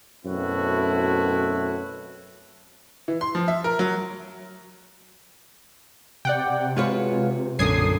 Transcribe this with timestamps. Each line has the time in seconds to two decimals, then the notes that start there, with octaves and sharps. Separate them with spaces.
0.25 F#2 B2 A3 C4 E4 F#4
3.08 E3
3.21 C6
3.35 F3
3.48 E5
3.64 A#4
3.79 F#3
6.25 C3 D5 F#5 G5
6.47 C3
6.76 G#3 F4 F#4 B4 C#5
7.59 B1 F#2 A#2 D3 D#6 G#6 C7